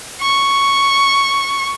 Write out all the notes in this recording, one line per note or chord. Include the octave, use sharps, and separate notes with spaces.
C#6